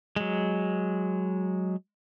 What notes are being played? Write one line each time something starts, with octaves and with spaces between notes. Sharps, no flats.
F#3 G#3